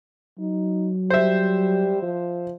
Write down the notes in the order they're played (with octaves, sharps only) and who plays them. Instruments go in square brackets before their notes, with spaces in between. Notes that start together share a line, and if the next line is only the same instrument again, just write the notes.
[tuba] F#3 [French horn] D#4
[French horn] G3 [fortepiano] C5 E5
[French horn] F3